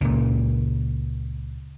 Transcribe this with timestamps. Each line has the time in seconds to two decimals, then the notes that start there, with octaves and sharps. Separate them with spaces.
0.01 C#2 A#2